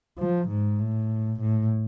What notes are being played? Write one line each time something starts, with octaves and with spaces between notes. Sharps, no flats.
F3
G#2
A2
A2